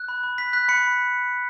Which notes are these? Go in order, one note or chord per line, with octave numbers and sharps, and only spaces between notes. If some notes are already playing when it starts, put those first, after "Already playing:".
Already playing: F#6
B5
B5
F#6 B6
F#6 B6
B5 C#7